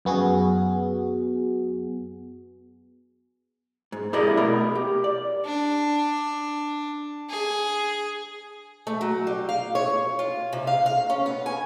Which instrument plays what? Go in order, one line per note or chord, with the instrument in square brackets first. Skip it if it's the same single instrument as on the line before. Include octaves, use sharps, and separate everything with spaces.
[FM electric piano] F#2 B3 F#4 G#4
[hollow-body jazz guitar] G#2
E4 G4 G#4 A#4 D5 D#5
B2 A3 A#4 B5
G4
D5
[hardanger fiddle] D4
G#4
[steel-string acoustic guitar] A3
F#3
G3
F5
C#5
F4
C3
F5
F5
C#4
B3
G#5